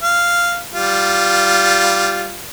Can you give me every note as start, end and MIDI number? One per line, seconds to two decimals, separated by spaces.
0.03 0.61 77
0.73 2.37 55
0.73 2.37 65